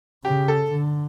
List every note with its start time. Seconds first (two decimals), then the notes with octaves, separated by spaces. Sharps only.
0.24 C#3 G4
0.48 A4
0.72 D3